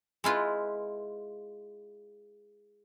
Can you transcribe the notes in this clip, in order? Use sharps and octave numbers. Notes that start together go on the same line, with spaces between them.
G#3 E4 F4 B4